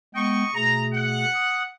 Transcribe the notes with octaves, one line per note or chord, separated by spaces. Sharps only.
G#3 B3 D#5 G5 C#6
B2 A3 G#4 A#5
F#5
D#6